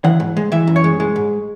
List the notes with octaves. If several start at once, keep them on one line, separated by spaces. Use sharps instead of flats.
E3 F#5
G#2
G#3
E3 E5
F#2
C#5
G#3
G#3
G#2